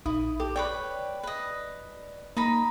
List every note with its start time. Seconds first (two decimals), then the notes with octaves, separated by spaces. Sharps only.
0.06 A#1 D#4 E4 D#6
0.40 G4 A4
0.56 B4 C#5 D5 G5
1.23 B4 D#5
2.37 A#3 D#4 A#5 B5